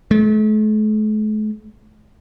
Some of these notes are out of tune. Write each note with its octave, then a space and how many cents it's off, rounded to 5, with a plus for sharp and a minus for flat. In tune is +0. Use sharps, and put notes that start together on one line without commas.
A3 -45